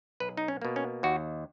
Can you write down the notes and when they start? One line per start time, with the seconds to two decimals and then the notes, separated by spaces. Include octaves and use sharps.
0.20 B1 B4
0.37 D#4
0.48 C#4
0.62 B2 A#3
0.76 C#4
1.03 D#2 F#4